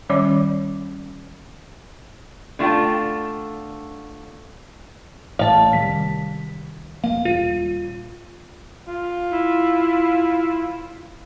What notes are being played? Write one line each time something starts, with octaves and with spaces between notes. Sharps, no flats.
D#3 G3 C#4 C#5 D5 D6
D3 A3 F4 G5 A5
A1 A2 C#5 F5 A5
C2 D#3 G3 B6
F1 A#3 F5
D#1 F4
F4
E4